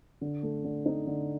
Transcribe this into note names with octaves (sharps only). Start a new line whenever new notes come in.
D3
A3
D3
D#4
D3